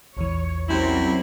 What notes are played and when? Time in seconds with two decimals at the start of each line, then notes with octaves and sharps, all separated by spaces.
0.17 A#1 E2 E3 C#5
0.69 F#2 C3 F#3 G3 C4 E4